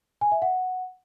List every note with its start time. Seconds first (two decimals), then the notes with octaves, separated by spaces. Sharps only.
0.21 G#5
0.32 E5
0.42 F#5